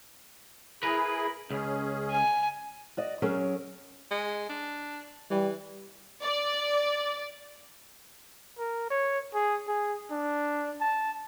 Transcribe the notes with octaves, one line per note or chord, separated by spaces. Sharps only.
E4 G#4 A#4 B4
C#2 C#4 G#4
G#5
F#4 D5 D#5
F#3 C#4 G#4 A#4
G#3
D4
E3 G3
D5
A#4
C#5
G#4
G#4
D4
A5